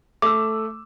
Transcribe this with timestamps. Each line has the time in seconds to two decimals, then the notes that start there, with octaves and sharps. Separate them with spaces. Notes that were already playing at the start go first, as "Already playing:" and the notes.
0.22 A3 D6 E6